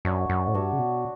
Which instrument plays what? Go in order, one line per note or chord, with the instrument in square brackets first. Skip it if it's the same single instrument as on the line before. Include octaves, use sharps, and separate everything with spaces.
[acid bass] F#2 [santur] D4 F#4 C#5 E5
[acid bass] F#2
A2
[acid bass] G2 [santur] D4 F#4 C#5 E5
[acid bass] C#3
B2